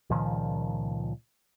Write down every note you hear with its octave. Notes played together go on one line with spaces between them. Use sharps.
C#2 A#2 D#3 F3